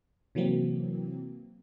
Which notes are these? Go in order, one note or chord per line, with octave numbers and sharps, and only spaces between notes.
C3 E3 F#3 A#3 C4